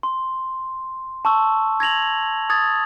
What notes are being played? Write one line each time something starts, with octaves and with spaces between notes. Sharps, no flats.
C6
A5 C#6 E6
G#6 A#6 F7 F#7
D#6 G#6 A6